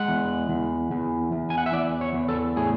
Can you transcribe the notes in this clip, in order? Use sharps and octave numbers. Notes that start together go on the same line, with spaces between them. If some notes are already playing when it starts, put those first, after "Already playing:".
Already playing: G#3 F#5
E2
E2
E2
E2
G#5
F#5
E5
E2 D5
C#5
E2
A4
A2 G#4